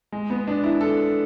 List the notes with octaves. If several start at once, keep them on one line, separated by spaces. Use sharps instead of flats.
G#3
B3
D4
E4
A4